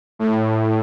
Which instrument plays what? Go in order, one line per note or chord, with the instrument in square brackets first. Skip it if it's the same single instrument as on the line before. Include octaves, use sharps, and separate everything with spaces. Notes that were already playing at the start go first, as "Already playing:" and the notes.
[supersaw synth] A2